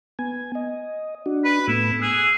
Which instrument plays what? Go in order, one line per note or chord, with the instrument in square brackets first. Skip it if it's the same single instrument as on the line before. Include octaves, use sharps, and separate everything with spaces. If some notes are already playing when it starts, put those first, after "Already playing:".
[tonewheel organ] B3 G#5
D#5
D4 F#4
[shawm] B4
[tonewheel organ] A2 A3 B3 [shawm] E4
[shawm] G#4 [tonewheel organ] E6 F#6